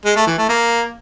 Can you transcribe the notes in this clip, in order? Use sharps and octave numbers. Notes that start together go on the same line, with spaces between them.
G#3
A3
E3
A3
A#3